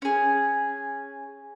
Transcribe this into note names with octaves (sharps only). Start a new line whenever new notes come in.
C#4 G#4